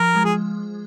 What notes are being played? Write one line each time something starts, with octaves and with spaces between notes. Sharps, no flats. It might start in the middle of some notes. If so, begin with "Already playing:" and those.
Already playing: F3 A#4
G#3
F3 G#4